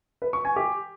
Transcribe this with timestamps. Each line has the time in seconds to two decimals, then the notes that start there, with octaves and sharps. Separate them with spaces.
0.22 B4
0.33 C#6
0.45 G#5
0.56 G4